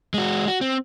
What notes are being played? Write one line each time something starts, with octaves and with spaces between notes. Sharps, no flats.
G#3 F#4
F#4
C4